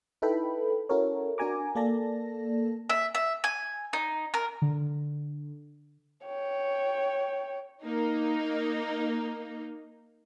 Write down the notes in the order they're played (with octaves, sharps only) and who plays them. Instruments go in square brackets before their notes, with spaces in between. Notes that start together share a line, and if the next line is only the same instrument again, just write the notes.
[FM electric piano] D#4 E4 A4 B4 G5 B5
C#4 E4 F#4 A4 A#4 C#5
D4 F#4 A#4 G#5 A#5 D6
A#3 A4 D5 A5 A#6
[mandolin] E5
E5
G#5
D#4
A#4
[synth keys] D3
[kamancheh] C#5 G5
[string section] A#3 D#4